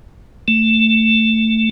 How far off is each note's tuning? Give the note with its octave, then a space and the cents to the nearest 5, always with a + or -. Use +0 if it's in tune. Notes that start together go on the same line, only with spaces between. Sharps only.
A3 +15